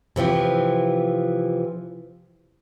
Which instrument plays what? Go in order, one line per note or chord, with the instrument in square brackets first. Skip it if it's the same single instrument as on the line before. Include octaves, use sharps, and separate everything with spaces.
[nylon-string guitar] C3 E3 F3 C4